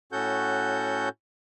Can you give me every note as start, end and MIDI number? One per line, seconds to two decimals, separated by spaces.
0.12 1.09 45
0.12 1.09 61
0.12 1.09 66
0.12 1.09 69
0.12 1.09 78
0.12 1.09 91